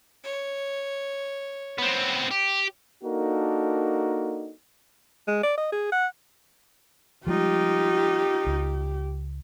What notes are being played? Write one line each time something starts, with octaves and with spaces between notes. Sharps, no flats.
C#5
B3 C4
G4
A#3 D4 D#4 F#4 A4 A#4
G#3
D5
D#5
G#4
F#5
F3 G3 G#3 D#4 F4 G4
C#2